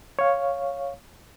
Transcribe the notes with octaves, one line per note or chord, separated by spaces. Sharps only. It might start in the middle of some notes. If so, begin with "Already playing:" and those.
C#5 F5